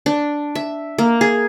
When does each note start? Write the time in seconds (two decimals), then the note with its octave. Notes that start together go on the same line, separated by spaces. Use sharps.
0.06 D4
0.55 E5
0.98 A#3
1.21 G#4